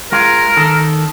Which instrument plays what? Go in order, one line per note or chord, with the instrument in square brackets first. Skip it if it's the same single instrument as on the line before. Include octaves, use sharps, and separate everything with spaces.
[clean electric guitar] G#3 F4 [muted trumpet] A#4
[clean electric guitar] D#3 A4